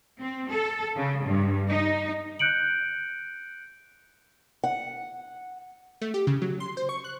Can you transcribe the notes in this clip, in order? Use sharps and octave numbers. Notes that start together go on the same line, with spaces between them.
C4
A4
C#3
G2
D#4
F#6 G6 C#7 D7 F#7
F#5
A3
G4
C#3
F#3
C6
C5
C#6
F#6